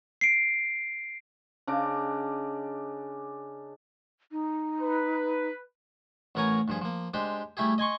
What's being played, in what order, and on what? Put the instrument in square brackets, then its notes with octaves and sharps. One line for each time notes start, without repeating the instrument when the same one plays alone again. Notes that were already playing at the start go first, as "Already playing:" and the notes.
[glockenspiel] C7 D7
[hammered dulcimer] C#3 D4 D#5 D6
[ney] D#4
[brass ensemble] B4
[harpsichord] A1 B3 A#4 C#5 G#5 A#5
G2 F3 G#4
F3 A#3
G#3 D4 G4 C5
G3 A3 E4 G4 G#4
D#5 G#5 C6 C#6